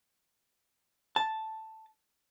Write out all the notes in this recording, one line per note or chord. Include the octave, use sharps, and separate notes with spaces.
A5